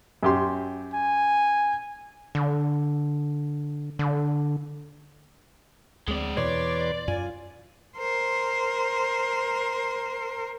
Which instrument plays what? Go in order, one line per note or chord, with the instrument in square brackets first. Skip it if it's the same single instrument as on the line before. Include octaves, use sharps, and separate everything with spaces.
[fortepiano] F#2 G4 C6
[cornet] G#5
[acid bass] D3
D3
[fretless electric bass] D2 C4 [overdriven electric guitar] G#3 D5
[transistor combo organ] E2 B4 C6 [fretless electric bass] B2 [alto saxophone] C#5 [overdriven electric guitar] D5
[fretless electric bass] F#2 [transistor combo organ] F4 [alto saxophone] G#5
[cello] A#4 C5